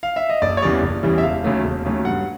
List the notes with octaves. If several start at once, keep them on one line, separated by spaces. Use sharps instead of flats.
F5
E5
D#5
F#1 D5
C#5
E2 C#3 E3 G3 D5
F#1
E2 C#3 E3 G3
E5
E1 F5
D#2 C#3 F#3 A3
E1
D#2 C#3 F#3 A3
G2 F#5